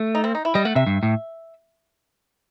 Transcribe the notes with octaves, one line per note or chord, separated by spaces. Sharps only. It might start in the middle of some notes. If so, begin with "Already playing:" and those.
Already playing: A3
D#4
C4
D#4
E4
G3 D#5
A3 F#5
C3 E5
G2
A2